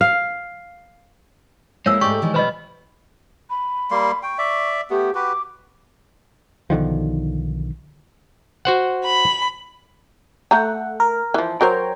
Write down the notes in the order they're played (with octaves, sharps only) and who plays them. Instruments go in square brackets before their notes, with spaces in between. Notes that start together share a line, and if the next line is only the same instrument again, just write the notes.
[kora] F5
[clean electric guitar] G#3 [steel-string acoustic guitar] A#3 E4 [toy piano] C#5 F5 E6
[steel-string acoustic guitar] G#2 G#3 A3 [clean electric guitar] G4 D5 [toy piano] C#6
[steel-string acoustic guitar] D#3 E3 G#3
[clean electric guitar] B1 G3 B5 [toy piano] B4 D#5
[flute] B5
[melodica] G3 A#3 C6
[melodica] G5 [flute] C#6
[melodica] D5 E5
[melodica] A3 B3 [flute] G4
[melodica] F#4 G4 B4 [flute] D6
[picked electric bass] B1 D3 D#3 F3
[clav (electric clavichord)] F#4 C5 F#5
[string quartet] B5
[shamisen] A3 A#5 [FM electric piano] A4 F#5
[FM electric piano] A#4
[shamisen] E3 F3
[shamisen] F#3 A#4 C5 [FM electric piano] C#5 G5 A#5